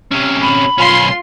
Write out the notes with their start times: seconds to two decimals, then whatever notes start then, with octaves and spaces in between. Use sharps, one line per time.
0.12 C3 C#4
0.41 B5
0.78 B1 C#4 F4 C6